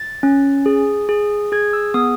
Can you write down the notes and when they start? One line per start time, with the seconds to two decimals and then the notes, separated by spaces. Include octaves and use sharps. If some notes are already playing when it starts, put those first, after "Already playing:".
Already playing: A6
0.23 C#4
0.66 G#4
1.09 G#4
1.52 G#4 G#6
1.73 E6
1.94 B3 D#6